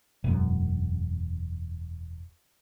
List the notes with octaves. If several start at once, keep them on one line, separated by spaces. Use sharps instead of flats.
E1 F#2